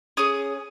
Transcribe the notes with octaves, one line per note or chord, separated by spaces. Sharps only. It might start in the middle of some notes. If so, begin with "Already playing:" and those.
C#4 G#4 D#6